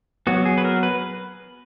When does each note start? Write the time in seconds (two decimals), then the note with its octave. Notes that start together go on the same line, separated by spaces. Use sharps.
0.27 F#3 B3 F#4
0.46 G#4
0.58 B4
0.65 A#4
0.83 B4